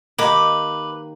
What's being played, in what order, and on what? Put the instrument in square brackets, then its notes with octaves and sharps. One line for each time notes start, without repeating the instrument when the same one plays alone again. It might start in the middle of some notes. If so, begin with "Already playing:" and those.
[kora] D#3 A#3 G4 [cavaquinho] B4 D6